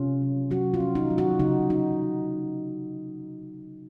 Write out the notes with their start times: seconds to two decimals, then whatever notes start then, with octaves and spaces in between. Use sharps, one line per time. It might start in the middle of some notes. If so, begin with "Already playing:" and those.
Already playing: C3 C#4 F4
0.22 F#3
0.51 F#3 F#4
0.74 F4
0.80 C#4
0.95 D#4
1.10 F#3
1.18 F#4
1.40 C#3 D#4
1.70 D#4